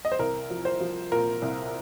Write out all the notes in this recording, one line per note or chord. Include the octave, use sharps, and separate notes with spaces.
D#5
C5
C2 A#4
F3
C5
F3
A#2 A#4
C2